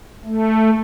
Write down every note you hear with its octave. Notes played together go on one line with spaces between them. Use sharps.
A3